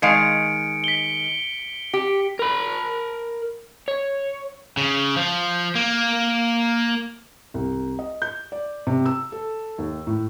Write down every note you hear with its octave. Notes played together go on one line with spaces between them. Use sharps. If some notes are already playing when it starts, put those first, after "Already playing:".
D#3 G#3 F5 C#7 D7
B6 G7
G4
A#4 B5
C#5
C#3
F3
A#3
C2
D#5
G6
D5
C3
E6
A4
D#2
A2